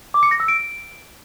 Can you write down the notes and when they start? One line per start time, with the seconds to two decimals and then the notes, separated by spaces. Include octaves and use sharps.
0.14 D6
0.23 C#7
0.31 A#6
0.40 E6
0.48 D7